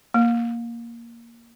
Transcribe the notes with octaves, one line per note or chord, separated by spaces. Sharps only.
A#3